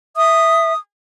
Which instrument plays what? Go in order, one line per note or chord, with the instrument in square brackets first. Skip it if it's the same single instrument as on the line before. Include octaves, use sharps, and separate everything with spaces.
[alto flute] E5 [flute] D#6